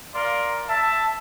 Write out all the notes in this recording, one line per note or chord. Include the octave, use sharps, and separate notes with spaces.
A#4 D5 F5 C6
E5 A5